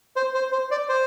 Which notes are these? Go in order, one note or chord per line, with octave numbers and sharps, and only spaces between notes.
C5
C5
C5
D5
C5